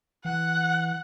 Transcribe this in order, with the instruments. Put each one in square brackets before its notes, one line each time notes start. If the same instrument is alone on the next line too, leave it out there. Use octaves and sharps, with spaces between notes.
[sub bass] E3 [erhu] F#5